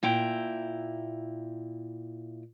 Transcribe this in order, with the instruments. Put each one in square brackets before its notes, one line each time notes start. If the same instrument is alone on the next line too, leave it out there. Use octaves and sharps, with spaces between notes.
[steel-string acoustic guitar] A#2 E4 G5 A#5